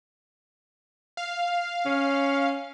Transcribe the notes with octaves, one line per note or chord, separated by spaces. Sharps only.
F5
C#4